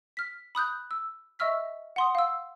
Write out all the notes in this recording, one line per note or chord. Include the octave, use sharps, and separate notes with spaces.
F6 B6
B5 D#6 F#6 G6
E6
D#5 E5 C#6 E6 F6 B6
F#5 C6 D#6
F5 E6